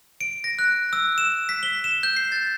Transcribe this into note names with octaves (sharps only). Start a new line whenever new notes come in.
D7
A#6
F#6
E6
E7
B6
G7
E7
G6
C7
A6